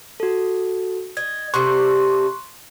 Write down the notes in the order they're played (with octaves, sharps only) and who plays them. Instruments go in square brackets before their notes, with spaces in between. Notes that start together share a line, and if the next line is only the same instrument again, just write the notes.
[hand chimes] F#4 A4
[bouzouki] D#5 [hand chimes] G#6
[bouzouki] C3 G3 A3 [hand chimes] C6 C#6 F#6